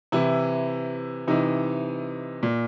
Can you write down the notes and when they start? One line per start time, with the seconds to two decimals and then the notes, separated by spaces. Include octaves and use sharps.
0.12 C3 E3 E4
1.28 C3 E3 D#4
2.43 A#2